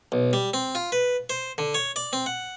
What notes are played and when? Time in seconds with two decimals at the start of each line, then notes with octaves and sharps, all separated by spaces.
0.12 B1
0.33 G3
0.54 C4
0.75 F4
0.92 B4
1.30 C5
1.58 D3
1.74 C#5
1.96 D5
2.13 C4
2.26 F#5